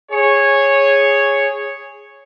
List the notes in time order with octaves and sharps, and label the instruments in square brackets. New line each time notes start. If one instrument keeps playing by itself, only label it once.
[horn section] G#4 C#5